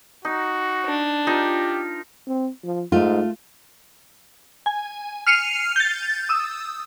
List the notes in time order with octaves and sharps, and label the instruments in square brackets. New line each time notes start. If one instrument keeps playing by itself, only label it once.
[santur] D#4 [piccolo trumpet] F#4
[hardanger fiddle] D4
[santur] D#4 F4 A#4 [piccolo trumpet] G4
[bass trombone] C4
F3
[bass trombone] G#2 [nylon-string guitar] A3 F4
[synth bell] G#5
F6 C7 C#7 D#7 F7
G6 A6
D#6 E6